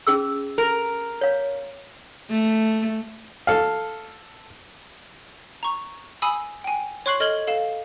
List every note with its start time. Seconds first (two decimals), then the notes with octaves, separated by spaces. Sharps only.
0.07 C#4 G#4 E6
0.58 A#4
1.21 C#5 F5
2.30 A3
3.47 A4 F5
5.63 A#5 C#6
6.22 G#5 B5 D#6 E6
6.64 G5 G#5
7.06 C#5 C6 C#6 F#6 C7 F#7
7.20 A4 D#5 F6 G#6 F#7 G7
7.47 A4 F5 E7